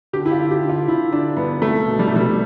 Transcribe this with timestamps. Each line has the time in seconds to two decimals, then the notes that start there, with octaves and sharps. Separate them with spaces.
0.13 D3 G4
0.26 E4
0.32 F4
0.38 D3
0.51 G4
0.62 D3
0.70 F4
0.88 D3 E4
1.13 D3 D4
1.37 G2 B3
1.62 C2 A3
1.87 B2
1.99 G3
2.07 A3
2.12 C2 G3